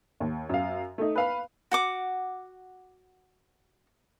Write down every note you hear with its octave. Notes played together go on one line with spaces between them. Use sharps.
D#2
F#2 F5
A3 D#4
B4 F5 B5
F#4 F#5 D6